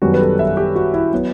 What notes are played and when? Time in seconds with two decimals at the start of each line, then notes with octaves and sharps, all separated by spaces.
0.02 F#2 D#3 G3 B3 F#4
0.14 B4
0.21 A4
0.39 E5
0.57 G4
0.76 F#4
0.94 E4
1.13 F#3 B3